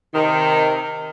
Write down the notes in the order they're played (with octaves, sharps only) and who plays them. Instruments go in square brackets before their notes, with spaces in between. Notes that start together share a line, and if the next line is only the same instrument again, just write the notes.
[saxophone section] C3 D#3